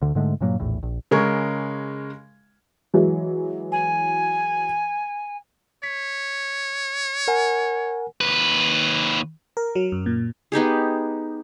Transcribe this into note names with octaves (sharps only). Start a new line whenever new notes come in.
D2 D3
G#2 D3 G#3 A3
G2 A#2 F#3 A#3
A#1 E2 A2
A#1
C#3 G#3 A#4 C#6 G#6
E3 F#3 G#3
G#5
C#5 B6
A#4 F#5 G#5
D#2 B4
A#4
F#3
F#2
A#2
B3 D#4 G4 G#4